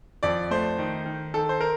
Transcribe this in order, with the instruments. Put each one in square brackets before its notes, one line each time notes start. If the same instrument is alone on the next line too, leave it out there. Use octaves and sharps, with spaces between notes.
[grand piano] F2 D5
A3 C5
D#3
D#3
D#3 A4
C5
A#4